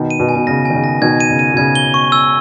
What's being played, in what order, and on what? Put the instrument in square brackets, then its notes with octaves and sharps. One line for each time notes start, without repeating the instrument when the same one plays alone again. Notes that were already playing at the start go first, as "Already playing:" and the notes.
Already playing: [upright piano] B2 D#3
[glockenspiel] D#7
[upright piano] B2
[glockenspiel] G#5
[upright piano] B2
[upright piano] C#3 [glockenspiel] A#6
[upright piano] D#3 [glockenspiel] G#5
[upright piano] C#3
[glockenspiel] A#6
[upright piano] B2 D#3 [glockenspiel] G#6
[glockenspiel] D#7
[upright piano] C#3
[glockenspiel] D#7
[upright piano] B2
[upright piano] C#3 [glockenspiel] G#6
[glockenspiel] G7
C#6
E6